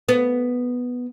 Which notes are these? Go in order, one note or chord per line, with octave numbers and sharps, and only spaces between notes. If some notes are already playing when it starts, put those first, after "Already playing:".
B3